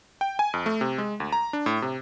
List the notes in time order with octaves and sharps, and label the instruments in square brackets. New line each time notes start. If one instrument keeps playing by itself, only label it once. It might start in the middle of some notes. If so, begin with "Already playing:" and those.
[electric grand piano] G5
G#5
F2
A3
C3
G#3
D2
A#5
D4
A2
C3